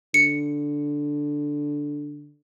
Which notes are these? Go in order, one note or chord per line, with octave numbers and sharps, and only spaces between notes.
D3 C#7